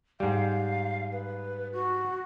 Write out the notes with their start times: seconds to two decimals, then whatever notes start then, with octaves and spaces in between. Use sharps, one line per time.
0.20 G#2 G3 F5
1.12 B4
1.73 F#4